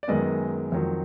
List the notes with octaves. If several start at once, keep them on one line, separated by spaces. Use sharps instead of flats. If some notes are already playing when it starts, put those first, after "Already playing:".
D5
F#2 D#3 G#3 B3 D#5
F2 D#3 F#3